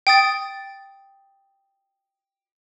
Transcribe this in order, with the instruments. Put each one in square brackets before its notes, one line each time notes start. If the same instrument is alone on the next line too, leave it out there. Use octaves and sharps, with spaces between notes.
[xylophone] G5 D#6 A6